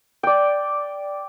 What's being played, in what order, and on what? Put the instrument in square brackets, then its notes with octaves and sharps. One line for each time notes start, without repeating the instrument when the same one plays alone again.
[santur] D5 G5